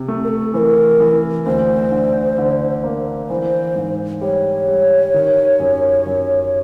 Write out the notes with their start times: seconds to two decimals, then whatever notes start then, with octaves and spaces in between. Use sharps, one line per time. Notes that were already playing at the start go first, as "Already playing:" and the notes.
Already playing: C3
0.08 A3
0.24 A#4
0.28 A4
0.54 E3 C5
0.57 A#4
1.00 E3
1.46 D2 C5
1.92 D3
2.38 D3
2.84 A#3
3.29 E3 C5
3.76 G#2
4.21 G3 C#5
4.67 G3
5.14 D#3
5.60 F#2
6.06 F#2